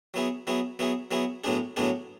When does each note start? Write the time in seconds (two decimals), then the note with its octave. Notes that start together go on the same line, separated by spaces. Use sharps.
0.14 F#3 B3 E4 G#4
0.47 F#3 B3 E4 G#4
0.79 F#3 B3 E4 G#4
1.11 F#3 B3 E4 G#4
1.44 A2 F#3 B3 D4 G#4
1.76 A2 F#3 B3 D4 G#4